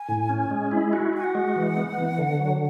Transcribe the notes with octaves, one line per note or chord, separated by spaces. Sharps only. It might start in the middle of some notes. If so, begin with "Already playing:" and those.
Already playing: G#5
A2
C#4
G#3
E4
F#4
F#4 G#5
F#5
G#3
E3
B3
E3
D3
F#3